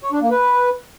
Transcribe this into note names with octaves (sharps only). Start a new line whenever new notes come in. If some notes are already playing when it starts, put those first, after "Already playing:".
C#5
D4
A#3
B4